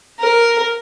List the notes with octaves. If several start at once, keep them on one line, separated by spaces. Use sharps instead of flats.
A#4